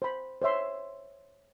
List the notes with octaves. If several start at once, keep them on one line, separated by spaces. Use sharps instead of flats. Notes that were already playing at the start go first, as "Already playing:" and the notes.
C5 B5
C5 C#5 E5 C6